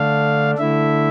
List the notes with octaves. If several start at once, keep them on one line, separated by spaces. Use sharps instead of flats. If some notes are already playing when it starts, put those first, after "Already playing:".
Already playing: D3 A3 D4 F5
D3 A3 E4 E5